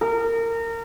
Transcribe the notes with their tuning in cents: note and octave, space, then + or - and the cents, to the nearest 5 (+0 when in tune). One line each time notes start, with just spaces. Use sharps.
A#4 -25